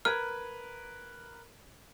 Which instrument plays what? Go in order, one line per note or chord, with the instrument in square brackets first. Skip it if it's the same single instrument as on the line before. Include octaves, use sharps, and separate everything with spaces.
[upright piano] A#4 B4 G#6 [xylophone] F6